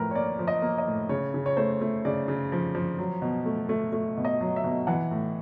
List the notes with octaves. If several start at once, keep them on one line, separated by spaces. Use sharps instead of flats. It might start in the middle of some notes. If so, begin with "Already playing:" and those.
Already playing: A2 F3 A#4 B4
C#5
A#3 D5
F3
D#5
A#3
D#5
A2
C#3 C#5
C#3
C#5
A3 C5
A3
C#3 D5
C#3
F3
F3
F#3
B2
A3
A3
A3
B2
D#5
F#3
E5
B2
E3 F#5
A2